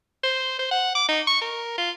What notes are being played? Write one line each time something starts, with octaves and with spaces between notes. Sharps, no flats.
C5
C5
F#5
D6
D#4
C#6
A#4
F4